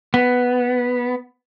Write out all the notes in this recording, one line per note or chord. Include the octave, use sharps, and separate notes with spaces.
B3